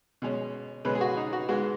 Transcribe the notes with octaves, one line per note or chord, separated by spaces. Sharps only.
B2 G#3 C#4
B2 G#3 C#4 B4
G#4
F#4
D#4
F#4
G#2 G#3 B3 F#4